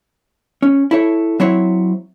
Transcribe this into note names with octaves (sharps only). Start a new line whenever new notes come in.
C#4
E4 A4 C#5
F#3 C4 E4 C#5